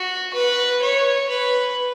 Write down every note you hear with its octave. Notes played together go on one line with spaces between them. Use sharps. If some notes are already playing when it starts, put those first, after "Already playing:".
Already playing: F#4
B4
C#5
B4